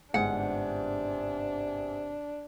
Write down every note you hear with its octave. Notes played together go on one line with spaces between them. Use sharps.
G1 G#2 C3 D4 F#5